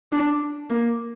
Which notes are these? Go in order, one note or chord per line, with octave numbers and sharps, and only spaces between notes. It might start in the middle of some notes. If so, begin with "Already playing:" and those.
D4
A#3